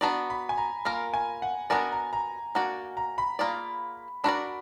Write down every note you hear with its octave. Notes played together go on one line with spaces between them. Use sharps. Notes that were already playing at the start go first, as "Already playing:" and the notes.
B3 D4 F#4 D5 A#5
B5
G#5
A#5
A#3 F4 A#4 A#5
G#5
F#5
B3 D4 F#4 A#4 D5 G#5
A#5
A#5
A#3 D4 F#4 D5 F#5
A#5
B5
A#3 F4 G#4 D5
D4 F#4 A#4 D5 B5